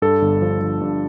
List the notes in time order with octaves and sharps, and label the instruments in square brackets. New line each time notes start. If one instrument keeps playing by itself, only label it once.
[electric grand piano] G2 A4
G1
F3
F3
G2